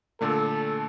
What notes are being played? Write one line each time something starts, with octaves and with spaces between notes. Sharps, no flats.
A#2 D3 A3 A4